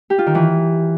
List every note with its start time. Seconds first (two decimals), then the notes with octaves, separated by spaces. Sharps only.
0.10 G4
0.18 F4
0.27 D#3
0.35 E3